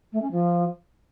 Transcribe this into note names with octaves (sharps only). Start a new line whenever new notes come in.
A3
C#4
F3